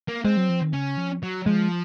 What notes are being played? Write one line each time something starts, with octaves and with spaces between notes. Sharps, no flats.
A#3
G#3 C4
F#3
F3
D#3
C#3 C#4
F3
F#3
F3 G#3